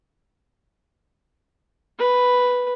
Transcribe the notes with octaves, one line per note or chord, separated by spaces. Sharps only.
B4